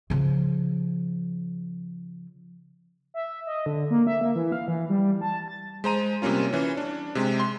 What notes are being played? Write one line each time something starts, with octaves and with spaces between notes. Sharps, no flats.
C#3 F3
E5
D#5
D3
A#3
E5
A#3
E3
F5
E3
G3
A5
A6
G#3 C5 A#5 D#7
C3 G3 A#3 C#4 F4
E3 C#4
D4
C3 G#3
C6